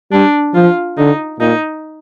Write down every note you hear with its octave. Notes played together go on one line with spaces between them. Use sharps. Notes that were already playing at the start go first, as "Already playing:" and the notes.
G3 D4
F3 F4
D3 D#4
A#2 D#4